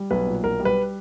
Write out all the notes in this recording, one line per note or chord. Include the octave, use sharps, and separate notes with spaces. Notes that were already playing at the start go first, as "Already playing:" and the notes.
Already playing: G3
B1 B4
A#2
B1 A#4
G3
B4